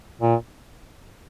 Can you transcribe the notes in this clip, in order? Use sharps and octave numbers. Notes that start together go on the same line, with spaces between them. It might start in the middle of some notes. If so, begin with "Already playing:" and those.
A#2